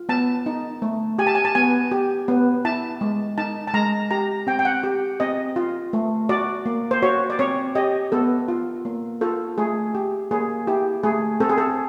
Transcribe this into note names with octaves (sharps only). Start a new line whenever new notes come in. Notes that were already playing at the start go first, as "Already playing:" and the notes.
Already playing: F4
B3 A5
D#4
A3
G4 G#5
A5
G#5
A5
B3 G#5
G4
B3
E4 A5
G#3
D#4 A5
A5
G#3 A#5
G4 A#5
C4 G5
G5
F#5
G4
C4 D#5
F4
A3
F#4 D5
A#3
C5
F#4 C#5
D5
C4 C#5
G4 D#5
B3 A4
F4
A#3
F4 A4
A3 G#4
G4
A#3 G#4
E4 G4
A3 G#4
C4 A4
G#4
A4